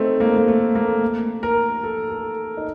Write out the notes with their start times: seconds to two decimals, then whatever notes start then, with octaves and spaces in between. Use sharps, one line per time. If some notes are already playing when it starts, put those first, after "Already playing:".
Already playing: A3 C4 D#4
0.20 A#3
0.37 A#3
0.48 A3
0.75 A#3
1.43 A#4
1.83 A4
2.10 A4
2.57 D#4